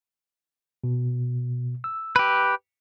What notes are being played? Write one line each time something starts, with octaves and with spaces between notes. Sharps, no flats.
B2
E6
G4 B4